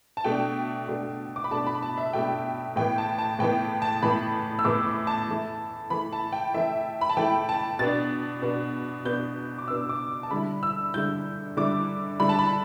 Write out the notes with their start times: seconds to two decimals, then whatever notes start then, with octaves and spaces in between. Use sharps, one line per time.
0.17 A5
0.24 B2 A3 D4 G5
0.88 B2 A3 D4
1.36 D6
1.44 B5
1.51 B2 A3 D4 A5
1.66 B5
1.82 A5
1.98 E5
2.13 B2 A3 D4 G5
2.76 A2 E3 B3 G5
2.98 A5
3.18 A5
3.39 A2 E3 B3 G5
3.82 A5
4.02 A2 E3 B3 B5
4.59 E6
4.65 A2 E3 B3 D6
4.87 D6
5.07 A5
5.29 E3 A3 E4
5.90 E3 A3 E4 B5
6.13 A5
6.33 G5
6.54 E3 A3 E4 E5
7.01 B5
7.09 A5
7.17 E3 A3 E4 G5
7.49 A5
7.79 B2 B3 D4 A6
8.42 B2 B3 D4
9.05 B2 B3 D4 G6
9.58 D6
9.68 B2 B3 D4 E6
9.89 D6
10.23 A5
10.31 D3 G3 E4 B5
10.63 E6
10.94 D3 G3 E4 G6
11.57 D3 G3 E4 D6
12.20 D3 G3 E4 B5
12.29 A5
12.39 B5